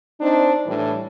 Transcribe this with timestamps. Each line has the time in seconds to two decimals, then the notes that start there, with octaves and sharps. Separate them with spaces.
0.21 C4 D4 D#4
0.67 A2 E3 G3 D4